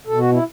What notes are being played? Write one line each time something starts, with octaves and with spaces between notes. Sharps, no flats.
B2 A4
F#4
E4